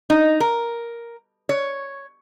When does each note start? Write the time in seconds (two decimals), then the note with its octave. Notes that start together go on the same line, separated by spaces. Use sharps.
0.10 D#4
0.40 A#4
1.49 C#5